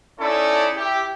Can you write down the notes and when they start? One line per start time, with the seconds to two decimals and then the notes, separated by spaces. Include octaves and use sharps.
0.20 C#4 D#4 E4 A4 C#5 D5
0.75 E4 G4